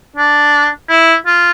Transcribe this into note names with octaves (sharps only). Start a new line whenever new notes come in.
D4
E4
F4